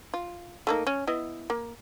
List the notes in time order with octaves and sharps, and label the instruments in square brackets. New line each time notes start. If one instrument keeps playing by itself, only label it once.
[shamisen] F4
A3 A#3 D#4
C#4
B3 E4 D#5
A#3